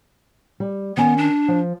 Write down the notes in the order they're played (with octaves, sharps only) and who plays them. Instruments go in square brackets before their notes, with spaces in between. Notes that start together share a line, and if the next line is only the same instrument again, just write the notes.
[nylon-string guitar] G3
[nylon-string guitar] D#3 C#4 G#5 [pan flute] B3
[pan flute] D4
[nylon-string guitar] F3